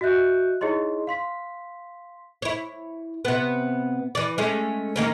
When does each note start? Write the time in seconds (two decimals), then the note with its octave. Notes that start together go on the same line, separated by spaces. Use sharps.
0.01 F#4 D#5 E5 F#6 G6
0.61 D#4 E4 G#4 C#5 D#5 C6
1.07 F5 C6 B6
2.42 E4 C#5
3.25 C3 B3
4.15 E3 D5
4.38 G#3 A3 C#4
4.96 D#3 A#3 C#4